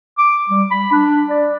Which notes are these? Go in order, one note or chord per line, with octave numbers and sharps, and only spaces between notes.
D6
G3
B5
D4
D5